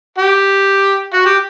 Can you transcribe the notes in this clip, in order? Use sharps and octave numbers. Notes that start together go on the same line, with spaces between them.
G4
F#4
G4